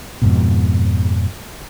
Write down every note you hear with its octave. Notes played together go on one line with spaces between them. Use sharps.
F2 G#2 B2